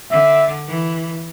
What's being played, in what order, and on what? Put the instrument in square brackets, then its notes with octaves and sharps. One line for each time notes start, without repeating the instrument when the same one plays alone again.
[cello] D3 [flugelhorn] E5
[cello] E3